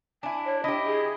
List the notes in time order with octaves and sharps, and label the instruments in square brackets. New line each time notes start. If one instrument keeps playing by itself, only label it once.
[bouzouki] D4 E4 [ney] G#5
[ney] C#5
[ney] D4 [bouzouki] E4 G4 [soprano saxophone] D#5
[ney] G#4